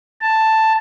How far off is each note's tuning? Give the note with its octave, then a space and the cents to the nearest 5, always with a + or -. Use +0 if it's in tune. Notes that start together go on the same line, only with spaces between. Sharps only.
A5 +5